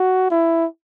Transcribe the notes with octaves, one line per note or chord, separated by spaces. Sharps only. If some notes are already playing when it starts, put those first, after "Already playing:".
Already playing: F#4
E4